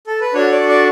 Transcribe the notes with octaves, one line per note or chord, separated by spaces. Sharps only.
A4
B4
D4 F#4 A4 C#5
D5
D5